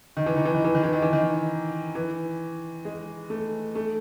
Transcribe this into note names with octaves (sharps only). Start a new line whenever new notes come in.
D#3
E3
D#3
E3
D#3
E3
D#3
E3
D#3
E3
D#3
E3
G#3
A3
A3